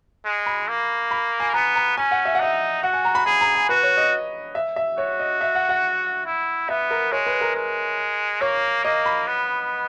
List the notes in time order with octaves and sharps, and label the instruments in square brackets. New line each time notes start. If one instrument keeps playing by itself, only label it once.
[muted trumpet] G#3
[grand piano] B5
[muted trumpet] A#3
[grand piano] B5
G#5
[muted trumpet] B3 [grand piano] A#5
[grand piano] A#5
[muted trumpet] C#4 [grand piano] G#5
[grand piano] F#5
E5
F#5
[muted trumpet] D#4 [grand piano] E5
[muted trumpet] F#4 [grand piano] F#5
[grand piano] G#5
A#5
B5
[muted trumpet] G#4 [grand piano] B5
[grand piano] A#5
G#5
[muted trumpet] F#4 [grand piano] B4
[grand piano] C#5
D#5
E5
E5
[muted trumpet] F#4 [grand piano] C#5
[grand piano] D#5
E5
F#5
F#5
[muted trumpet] E4
[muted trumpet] B3 [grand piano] E5
[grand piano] A#4
[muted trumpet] G#3 [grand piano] C#5
[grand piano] B4
A#4
[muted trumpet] G#3
[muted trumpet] A#3 [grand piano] C#5
[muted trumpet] A#3 [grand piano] D#5
[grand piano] B5
[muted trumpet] B3